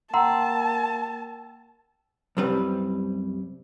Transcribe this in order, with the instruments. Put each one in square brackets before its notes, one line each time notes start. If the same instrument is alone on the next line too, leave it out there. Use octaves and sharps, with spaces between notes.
[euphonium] A#3 [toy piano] F#5 A#5 C6 [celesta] G5 E6 [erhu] A5
[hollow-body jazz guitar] C2 F#2 G3 C4 B4